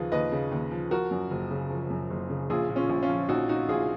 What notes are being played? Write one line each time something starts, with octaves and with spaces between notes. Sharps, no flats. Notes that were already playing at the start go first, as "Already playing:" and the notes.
Already playing: D#2 C#3 F3 F4 G#4 B4
D#2 B4 D#5
C#3
D#2
F3
F3 F#4 A#4
F#2
F#1
C#3
F3
F#2
F#1
C#3
A#1 F4 G#4
A#2
C#4 F4
A#1
C#4 F4
F3
A#1 D#4 F#4
A#2 D#4 F#4
A#1 F4 G#4